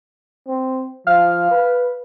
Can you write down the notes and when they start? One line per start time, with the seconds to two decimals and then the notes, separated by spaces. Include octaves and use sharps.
0.47 C4
1.07 F3 F5 F6
1.51 B4